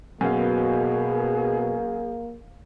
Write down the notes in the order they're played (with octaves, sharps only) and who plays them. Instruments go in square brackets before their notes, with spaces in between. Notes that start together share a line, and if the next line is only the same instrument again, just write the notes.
[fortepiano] F#2 F5 [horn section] B2 [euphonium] A#3 [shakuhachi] G#4